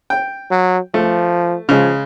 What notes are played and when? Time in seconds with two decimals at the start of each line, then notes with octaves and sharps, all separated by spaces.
0.10 G5
0.51 F#3
0.94 F3 A3
1.69 C#3 F3 G#3